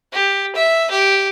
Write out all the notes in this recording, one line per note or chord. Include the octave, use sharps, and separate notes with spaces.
G4
E5
G4